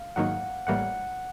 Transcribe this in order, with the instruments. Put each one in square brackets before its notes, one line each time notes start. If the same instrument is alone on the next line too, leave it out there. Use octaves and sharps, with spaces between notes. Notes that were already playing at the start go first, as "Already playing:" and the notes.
Already playing: [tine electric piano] F5
[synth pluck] G#2 D#3 F#3 A#3 D#4 [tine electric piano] F#5
[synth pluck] A1 A2 E3 G3 A#3 [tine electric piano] F#5